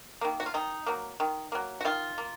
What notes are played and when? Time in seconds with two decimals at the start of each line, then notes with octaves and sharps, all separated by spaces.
0.21 D#3 A#3
0.40 F#4
0.46 F4
0.54 D#3 D#4
0.86 F#3 A#3
1.20 D#3
1.52 F#3 A#3
1.81 F#4
1.85 D#3 F4
2.18 A#3